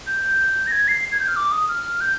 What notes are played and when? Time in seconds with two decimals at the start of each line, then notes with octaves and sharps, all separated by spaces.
0.07 G6
0.67 A#6
0.72 G#6
0.88 C7
1.12 G#6
1.20 G6
1.28 F6
1.36 D6
1.52 D#6
1.68 F6
2.01 G6